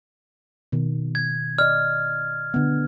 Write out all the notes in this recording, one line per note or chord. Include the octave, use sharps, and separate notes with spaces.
B2 D#3
G#6
D5 D#5 F6
D3 B3